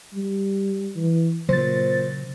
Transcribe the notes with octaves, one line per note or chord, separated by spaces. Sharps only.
G3
E3
A#2 C#3 F#3 C5 A6